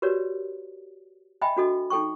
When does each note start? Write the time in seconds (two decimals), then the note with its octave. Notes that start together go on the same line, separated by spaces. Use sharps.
0.02 F#4 G4 A#4 B4 C#5 D5
1.41 D#5 E5 G5 G#5 B5
1.57 D4 F#4 A4 D#5
1.90 D#4 A4 G5 C#6